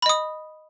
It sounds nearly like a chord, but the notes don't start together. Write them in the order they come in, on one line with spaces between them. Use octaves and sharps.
B5 D#5 D#6